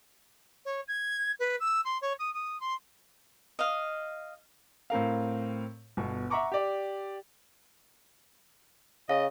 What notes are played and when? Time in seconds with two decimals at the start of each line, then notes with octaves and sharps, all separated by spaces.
0.65 C#5
0.88 G#6
1.39 B4
1.60 E6
1.85 C6
2.01 C#5
2.19 D#6
2.34 D#6
2.60 C6
3.59 D#5 F5
4.90 A2 C4 A#4 F5
5.97 G1 B2
6.30 E5 F#5 A#5 C#6 D6
6.52 G4 D5
9.09 C#3 D#5 F5